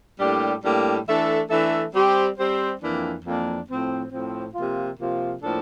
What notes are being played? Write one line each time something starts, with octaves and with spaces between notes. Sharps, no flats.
A2 G3 A#3 D4 G4
A2 G3 A#3 D4 G4
E3 A3 D4 A4 E5
E3 A3 D4 A4 E5
G3 C4 G4 C5
G3 C4 G4 C5
F2 E3 A#3 D4
F2 E3 A#3 D4
A2 F3 C4
A2 F3 C4
C3 F3 A#3 F4
C3 F3 A#3 F4
A2 F3 A#3 D4 A4